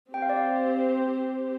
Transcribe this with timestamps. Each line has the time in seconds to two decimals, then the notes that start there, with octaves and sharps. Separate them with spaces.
0.14 C4 G4 C5 G5
0.22 F5
0.29 D5
0.37 F5